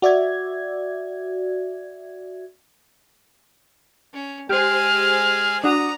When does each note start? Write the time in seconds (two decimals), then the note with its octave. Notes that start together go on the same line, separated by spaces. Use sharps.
0.02 F#4 D5 E5 G#6
4.13 C#4
4.49 G#3 G4 G#4 C5 F6
5.64 D4 F#4 A#5 D#6